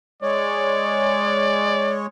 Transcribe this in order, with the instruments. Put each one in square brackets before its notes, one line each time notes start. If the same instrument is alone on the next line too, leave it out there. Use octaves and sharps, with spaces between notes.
[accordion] G#3 C#5 [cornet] D5